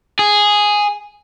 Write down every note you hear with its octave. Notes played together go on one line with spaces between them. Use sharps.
G#4